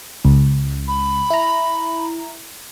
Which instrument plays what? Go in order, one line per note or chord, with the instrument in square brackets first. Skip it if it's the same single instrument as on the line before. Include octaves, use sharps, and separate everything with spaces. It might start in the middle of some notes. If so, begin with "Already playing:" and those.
[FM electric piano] C#2
[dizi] B5
[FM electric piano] E4 A#5